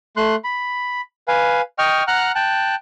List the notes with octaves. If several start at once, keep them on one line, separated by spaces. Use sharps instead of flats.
A3 C6 F#6
B5
B4 F5 G#5
D#5 G5 C#6 F6
F#5 A#5 F6 F#6
G5 A5 F#6